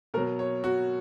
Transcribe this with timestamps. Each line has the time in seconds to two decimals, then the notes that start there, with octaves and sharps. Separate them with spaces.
0.14 B2 A#4
0.18 F#3
0.39 C#5
0.64 F#4